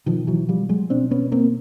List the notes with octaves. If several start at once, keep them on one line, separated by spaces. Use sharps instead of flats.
B2 D#3 F3
E3 F#3
F3 G3
F#3 G#3
B2 C4 D4
B3 C#4
A#3 C4